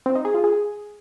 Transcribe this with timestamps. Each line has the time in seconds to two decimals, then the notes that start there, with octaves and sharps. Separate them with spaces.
0.06 C4
0.15 D#4
0.25 G#4
0.34 F4
0.44 G#4